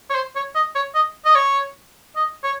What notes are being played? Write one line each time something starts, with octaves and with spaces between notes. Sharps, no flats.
C#5
C5
C#5
D#5
C#5
D#5
D#5
C#5
D#5
C#5